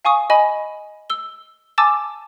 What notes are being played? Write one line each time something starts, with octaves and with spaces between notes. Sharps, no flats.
F5 G#5 C#6 D#6
D#5 G#5 B5
E6 G7
G#5 A5 D6 E6 A6 E7